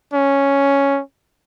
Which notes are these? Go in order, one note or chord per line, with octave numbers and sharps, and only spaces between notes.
C#4